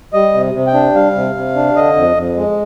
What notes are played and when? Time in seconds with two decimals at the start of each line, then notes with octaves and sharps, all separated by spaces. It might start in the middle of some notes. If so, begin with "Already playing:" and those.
0.13 G3 D#5
0.34 C3
0.54 C3
0.67 G5
0.74 D4
0.95 G3 F5
1.15 C3
1.35 C3
1.55 D4
1.76 D3 D#5
1.96 F2
2.16 F2
2.36 G#3